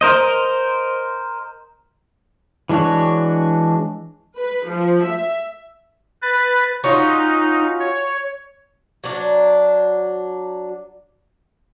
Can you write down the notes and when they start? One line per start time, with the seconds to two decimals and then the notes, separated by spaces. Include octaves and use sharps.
0.01 A#4 C5 D#5
2.69 E3 G#3 D4 F#4 C#5
4.38 B4
4.67 F3
5.03 E5
6.22 B4 A6
6.84 C#4 D#4 F4 F#4
7.80 C#5
9.04 F#3 D4